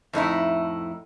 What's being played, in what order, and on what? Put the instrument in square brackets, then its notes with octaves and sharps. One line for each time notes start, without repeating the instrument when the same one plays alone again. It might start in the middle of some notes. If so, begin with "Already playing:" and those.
[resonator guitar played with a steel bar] F2 A2 D#4 E4